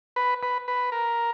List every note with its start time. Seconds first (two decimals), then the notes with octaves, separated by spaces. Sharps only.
0.16 B4
0.43 B4
0.68 B4
0.92 A#4